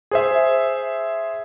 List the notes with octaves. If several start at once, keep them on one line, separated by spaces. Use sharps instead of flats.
G#4 C5 E5